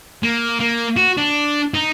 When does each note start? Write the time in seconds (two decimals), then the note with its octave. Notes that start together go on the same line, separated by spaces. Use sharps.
0.24 A#3
0.61 A#3
0.97 F#4
1.18 D4
1.74 D#4